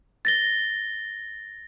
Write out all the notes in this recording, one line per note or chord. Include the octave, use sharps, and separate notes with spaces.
A6 A#6 G7